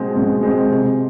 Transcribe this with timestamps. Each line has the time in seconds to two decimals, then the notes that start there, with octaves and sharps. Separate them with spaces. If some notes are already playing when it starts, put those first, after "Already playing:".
Already playing: B2 G#3 C4
0.17 B2
0.43 G#3 C4
0.70 C3